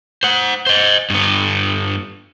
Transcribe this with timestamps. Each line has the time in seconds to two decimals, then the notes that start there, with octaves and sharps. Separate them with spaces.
0.23 C5 F#5
0.67 C5 D#5
1.10 G2 B3